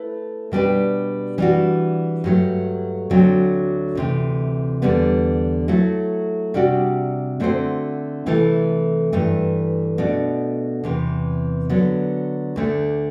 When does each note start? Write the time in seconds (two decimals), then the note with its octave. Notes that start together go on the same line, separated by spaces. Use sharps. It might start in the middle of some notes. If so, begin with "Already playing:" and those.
Already playing: A3 E4 B4
0.52 B2 G3 D4 G4 B4
1.38 E3 G3 D4 F#4
2.24 G2 F#3 A3
3.10 D2 D3 F#3 A3 C4
3.95 D2 C3 E3
4.82 E2 D3 G3 B3
5.68 F#3 A3 E4 A4
6.54 C3 G3 D4 F#4
7.40 D3 A3 C4 F#4 C5
8.26 C3 E3 A3 E4 A4
9.13 G2 E3 A3
9.98 B2 A3 D4
10.84 E2 C3 E3
11.69 D3 F#3 B3
12.56 D2 D3 A3